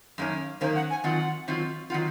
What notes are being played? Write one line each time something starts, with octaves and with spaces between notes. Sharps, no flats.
F#2 D#3 A#3 C#4
F#2 D#3 A#3 C#4 C5
F#5
G#5
D#3 F#3 C4 F4 F#5
D#3 F#3 C4 F4
D#3 F#3 C4 F4 F#5